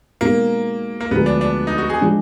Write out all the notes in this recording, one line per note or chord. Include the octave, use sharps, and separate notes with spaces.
B2 G#3 A#3 D#4 A#4
A#3
D2 D3 F3 G#3 B3
D4
D4
D#4
F#4
G#4
F3 G#3 D4